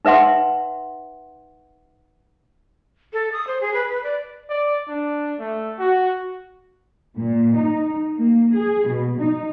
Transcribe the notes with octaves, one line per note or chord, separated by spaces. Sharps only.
D#4 B4 E5 F#5 C6
A4
D#6
C5
G#4
B4
B4
D5
D5
D4
A3
F#4
A#2
D#4
A#3
G#4
B2
D#4